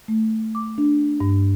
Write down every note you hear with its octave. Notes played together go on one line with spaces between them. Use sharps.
A3
D6
D4
G2